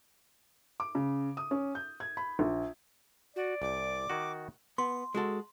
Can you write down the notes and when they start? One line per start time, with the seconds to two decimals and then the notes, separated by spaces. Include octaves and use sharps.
0.80 D6
0.95 C#3
1.37 D#6
1.51 C#4
1.75 G6
2.00 G#6
2.17 B5
2.39 A#1
3.36 F#4 D5
3.62 C2 D6
4.10 D#3 F#4
4.78 B3 C6
5.15 G#3 F#4 A4